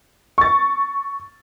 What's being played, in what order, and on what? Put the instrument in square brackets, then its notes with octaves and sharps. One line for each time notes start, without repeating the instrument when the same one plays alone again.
[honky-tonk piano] C#6 A6